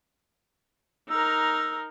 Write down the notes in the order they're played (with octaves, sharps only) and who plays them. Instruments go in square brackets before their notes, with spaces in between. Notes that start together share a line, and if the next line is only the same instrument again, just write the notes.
[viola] D#4 A#4 [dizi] E6